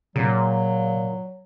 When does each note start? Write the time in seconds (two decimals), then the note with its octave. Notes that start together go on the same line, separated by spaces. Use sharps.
0.16 A#2 C#3 F#3